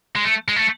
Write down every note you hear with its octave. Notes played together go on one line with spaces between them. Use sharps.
G#3
A3
G#3
A3